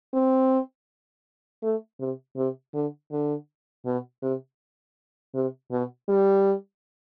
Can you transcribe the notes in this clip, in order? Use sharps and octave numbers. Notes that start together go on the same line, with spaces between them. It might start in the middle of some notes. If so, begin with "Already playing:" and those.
C4
A3
C3
C3
D3
D3
B2
C3
C3
B2
G3